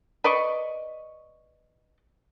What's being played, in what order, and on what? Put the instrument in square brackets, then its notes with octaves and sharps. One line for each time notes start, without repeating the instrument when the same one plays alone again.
[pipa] B4 D5 D#5 C#6